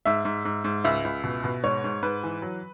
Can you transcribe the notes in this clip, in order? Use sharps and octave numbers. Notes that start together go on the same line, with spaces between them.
G#2 E5
G#2
G#2
G#2
C#2 E5
C#2
B2
B2
G#2 C#5
G#2
G#2 B4
E3
F#3